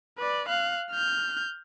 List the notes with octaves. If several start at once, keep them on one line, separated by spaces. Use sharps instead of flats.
B4 D5
F5 F#6
F6 G6